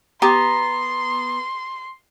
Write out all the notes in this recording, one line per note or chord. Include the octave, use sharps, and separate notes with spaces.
B3 G4 A#5 C6